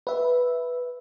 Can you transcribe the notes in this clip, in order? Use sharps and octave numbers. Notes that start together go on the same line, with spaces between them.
B4 E5